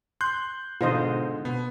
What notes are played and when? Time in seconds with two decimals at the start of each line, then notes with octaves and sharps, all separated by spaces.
0.21 C6 F#6 G6
0.81 G#2 B2 D3 F4 C5 D#5
1.45 B2 B3